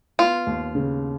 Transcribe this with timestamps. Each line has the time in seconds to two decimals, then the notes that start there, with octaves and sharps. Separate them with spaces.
0.19 B3 F4
0.47 D#2
0.75 C#3